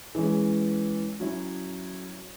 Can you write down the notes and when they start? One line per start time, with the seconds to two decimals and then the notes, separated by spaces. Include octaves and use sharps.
0.15 E3 G#3 C#4
1.20 F#3 C#4 E4